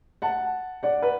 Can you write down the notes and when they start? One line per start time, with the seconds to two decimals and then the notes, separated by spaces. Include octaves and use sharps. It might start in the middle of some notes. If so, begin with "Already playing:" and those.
0.22 F#5 A5
0.83 D5 F#5
1.02 B4